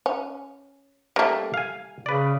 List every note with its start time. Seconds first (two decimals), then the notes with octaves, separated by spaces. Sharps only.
0.06 C#4
1.16 G3 A3 A#3 C#4 A#4
1.54 F5 G#5
2.06 C#3 B4 D5